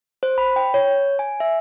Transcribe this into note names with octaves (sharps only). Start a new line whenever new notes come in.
C5
B5
G5
C#5
G#5
E5